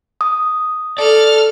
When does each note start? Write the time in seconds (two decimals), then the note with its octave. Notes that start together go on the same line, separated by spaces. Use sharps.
0.21 D#6
0.98 A4 D5 F6